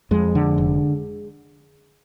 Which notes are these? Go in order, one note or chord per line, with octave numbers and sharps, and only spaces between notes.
F2 G#3
D3
F1